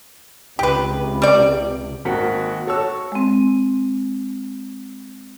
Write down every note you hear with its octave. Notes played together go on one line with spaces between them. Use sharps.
C#2 C3 G4 B4
G3 D5
G#1 A#3 F#4 F#5 G5 B6
F#4 A4 C#5 C#6 E6
G#3 C4